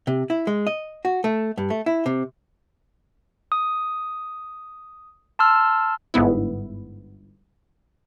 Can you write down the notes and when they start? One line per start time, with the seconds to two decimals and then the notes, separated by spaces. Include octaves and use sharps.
0.07 C3
0.30 E4
0.47 G#3
0.67 D#5
1.05 F#4
1.24 A3
1.58 G2
1.70 A3
1.86 E4
2.06 C3
3.52 D#6
5.39 A5 C6 E6 F6
6.14 G1 G#2 B3 E4